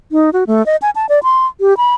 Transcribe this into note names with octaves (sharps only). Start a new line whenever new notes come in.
D#4
F#4
A3
D#5
G#5
A5
D5
C6
G4
B5